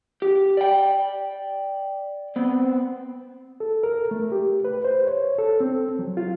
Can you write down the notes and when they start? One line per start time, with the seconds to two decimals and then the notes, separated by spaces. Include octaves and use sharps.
0.22 G4
0.57 D5 G5
2.36 B3 C4
3.60 A4
3.83 A#4
4.11 A3
4.32 G4
4.65 B4
4.84 C5
5.07 C#5
5.38 A4
5.60 C4
5.99 F#3
6.17 F4